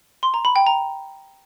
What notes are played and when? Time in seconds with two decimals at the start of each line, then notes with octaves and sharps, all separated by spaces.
0.23 C6
0.34 A#5
0.45 B5
0.56 G5
0.67 A#5